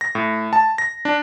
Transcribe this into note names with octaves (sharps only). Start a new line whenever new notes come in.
A#6
A2
A5
A#6
D4